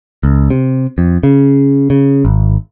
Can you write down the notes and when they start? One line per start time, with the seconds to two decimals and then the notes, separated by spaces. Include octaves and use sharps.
0.23 C#2
0.50 C3
0.98 F2
1.23 C#3
1.90 C#3
2.25 G#1